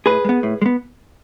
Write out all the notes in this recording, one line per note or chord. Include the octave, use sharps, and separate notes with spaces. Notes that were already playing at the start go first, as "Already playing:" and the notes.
A2 G#4 B4
G#3
B3
A2
G#3
B3